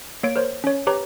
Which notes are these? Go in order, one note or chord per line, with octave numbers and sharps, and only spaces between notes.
A#3 C#5 D7
A#4 C5 C#5
C#4 C#5
G4 B4 C#5 A#5 D6